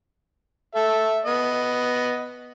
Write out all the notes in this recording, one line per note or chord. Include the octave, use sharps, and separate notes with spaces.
A4 E5
B3 D#5